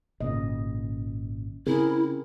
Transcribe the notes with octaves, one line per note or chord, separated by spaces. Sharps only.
G#1 A#2 C#3 D#5
C#3 C4 E4 G#4 A#4